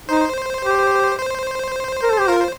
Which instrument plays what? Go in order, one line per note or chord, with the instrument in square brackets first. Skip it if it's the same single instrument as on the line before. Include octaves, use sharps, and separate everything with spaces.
[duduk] D#4 [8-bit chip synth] C5
[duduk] G4
[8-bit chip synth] C5
[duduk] A#4
A4
G4
[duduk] F4 [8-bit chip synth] A#4
[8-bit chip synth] C5